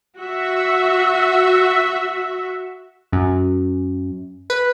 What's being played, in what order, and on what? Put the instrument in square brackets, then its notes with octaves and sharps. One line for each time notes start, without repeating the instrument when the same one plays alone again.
[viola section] F#4 E5
[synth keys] F#2
B4